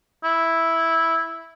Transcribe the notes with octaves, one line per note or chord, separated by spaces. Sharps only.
E4